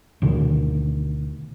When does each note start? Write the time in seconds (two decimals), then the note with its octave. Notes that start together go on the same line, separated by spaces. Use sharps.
0.22 D2 B2 D#3